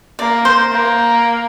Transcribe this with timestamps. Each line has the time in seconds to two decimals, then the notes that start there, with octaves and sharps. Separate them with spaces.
0.19 A#3 D5
0.45 C5
0.72 A#3